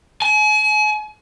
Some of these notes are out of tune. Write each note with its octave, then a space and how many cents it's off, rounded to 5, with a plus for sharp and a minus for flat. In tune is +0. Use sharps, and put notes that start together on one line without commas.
G#5 +40